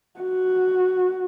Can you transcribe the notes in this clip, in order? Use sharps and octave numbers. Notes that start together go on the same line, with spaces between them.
F#4